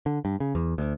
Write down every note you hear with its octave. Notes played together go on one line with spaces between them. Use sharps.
D3
G2
C#3
E2
D2